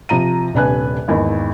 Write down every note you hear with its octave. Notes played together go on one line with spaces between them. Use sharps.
C3 F3 A#5 D#7
D#1 C3 D4 B4 G#5 F#6
G#1 E2 A#3 D#4